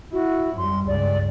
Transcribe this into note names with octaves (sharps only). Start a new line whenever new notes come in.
E4 F#4
F#2 G3 C6
C#2 G2 D5